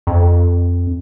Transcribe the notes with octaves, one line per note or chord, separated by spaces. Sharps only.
F2